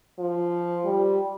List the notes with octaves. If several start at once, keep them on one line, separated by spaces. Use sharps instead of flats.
F3
G3